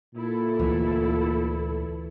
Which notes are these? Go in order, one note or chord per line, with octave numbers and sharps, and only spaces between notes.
A#2 E4 A4
D2 E3